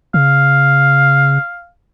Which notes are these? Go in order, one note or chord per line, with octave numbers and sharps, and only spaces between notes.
C#3 F5